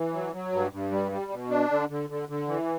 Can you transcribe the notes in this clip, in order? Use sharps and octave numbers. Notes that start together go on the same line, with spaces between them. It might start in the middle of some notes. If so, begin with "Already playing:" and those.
Already playing: E3
F#3
F#3
G2
G2
G3
G3
B2
D4
D3
D3
D3
D3
E3